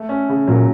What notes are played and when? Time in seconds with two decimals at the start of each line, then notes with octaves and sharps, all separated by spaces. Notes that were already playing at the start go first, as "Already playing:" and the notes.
Already playing: A3
0.09 C#4
0.29 C#3
0.48 A#2 F#3